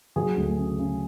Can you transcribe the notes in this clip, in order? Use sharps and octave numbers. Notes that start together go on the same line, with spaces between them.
F#3 G#4
D2
C#3
C#3